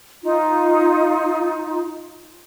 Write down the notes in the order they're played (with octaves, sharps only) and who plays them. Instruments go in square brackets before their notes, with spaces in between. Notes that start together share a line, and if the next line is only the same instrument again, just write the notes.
[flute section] D#4 F4